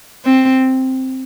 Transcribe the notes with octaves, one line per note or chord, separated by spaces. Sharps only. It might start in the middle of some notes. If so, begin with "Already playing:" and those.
C4